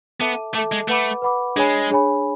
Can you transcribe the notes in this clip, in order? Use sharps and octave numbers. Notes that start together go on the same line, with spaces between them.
B3 A4 E5 A5 D6
A3 A4 E5 A5 D6
G#3
A3 B4 F#5 B5 D6
B4 F#5 B5 D6
G#3 D4 G#4 C#5 G#5 B5
D4 G#4 C#5 G#5 B5